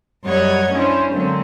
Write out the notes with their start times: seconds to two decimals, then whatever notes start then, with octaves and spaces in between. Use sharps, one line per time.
0.24 F#2 G3 C#5 D#5 F#5 G#6
0.73 C#4 D4 E4 C5
1.13 D3 F#3 G#3 A#3 C4 C#4